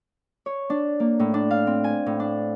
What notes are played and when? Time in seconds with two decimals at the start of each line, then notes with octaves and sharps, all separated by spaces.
0.46 C#5
0.70 D4
1.00 A#3
1.20 A2
1.34 D4
1.51 F5
1.67 C4
1.84 G#5
2.06 A2
2.20 D4